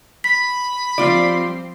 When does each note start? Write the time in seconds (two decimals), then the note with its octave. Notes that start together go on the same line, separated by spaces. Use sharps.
0.24 B5 B6
0.98 F3 G3 C4 F4 D5